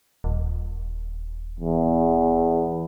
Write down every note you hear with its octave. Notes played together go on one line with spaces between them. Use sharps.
D#1
E2